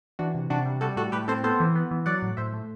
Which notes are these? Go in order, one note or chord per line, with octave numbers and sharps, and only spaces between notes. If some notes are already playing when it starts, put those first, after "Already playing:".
E3 D4 F#4
C3
C3 D4 F#4
G3
G3 F#4 A4
A2 F#4 A4
A2 G4 B4
C4 A4 C5
B3 A4 C5
E3
B3
E3
F#3 D5 F#5
A2
A2 C5 E5
A3